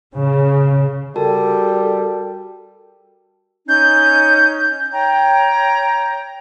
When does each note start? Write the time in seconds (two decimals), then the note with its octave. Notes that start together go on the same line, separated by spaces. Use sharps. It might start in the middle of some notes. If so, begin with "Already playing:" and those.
0.16 C#3
1.16 G3 F#4 A4 A#4 A5
3.67 C#4 D#4 G6
4.93 C#5 G5 A#5